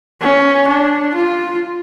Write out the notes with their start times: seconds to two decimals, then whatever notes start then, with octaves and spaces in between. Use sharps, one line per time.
0.21 C#4
0.68 D4
1.14 F4